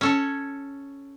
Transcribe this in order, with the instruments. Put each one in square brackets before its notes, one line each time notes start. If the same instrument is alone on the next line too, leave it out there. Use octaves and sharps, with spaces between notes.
[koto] C#4 A4 C#5